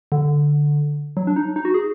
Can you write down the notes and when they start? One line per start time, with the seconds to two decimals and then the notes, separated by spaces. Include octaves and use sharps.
0.12 D3
1.17 F#3
1.27 D4
1.36 D#4
1.56 D#4
1.65 F#4
1.74 G#4